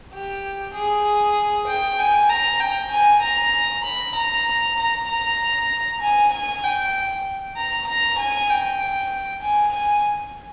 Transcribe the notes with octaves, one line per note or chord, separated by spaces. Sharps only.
G4
G#4
G5
G#5
A#5
G5
G#5
A#5
B5
A#5
A#5
A#5
G#5
G#5
G5
A#5
A#5
G#5
G5
G#5
G#5